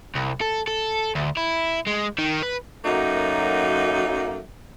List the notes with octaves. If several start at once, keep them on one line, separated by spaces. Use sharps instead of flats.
C2
A4
A4
D2
E4
G#3
D#3
B4
F#2 F#3 A3 A#3 D#4